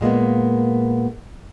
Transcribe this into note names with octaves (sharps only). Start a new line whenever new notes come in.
A#2 G#3 A#3 B3